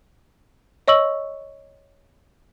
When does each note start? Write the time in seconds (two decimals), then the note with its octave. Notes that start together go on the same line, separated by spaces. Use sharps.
0.88 C#5 D#5 C#6 E6 F#7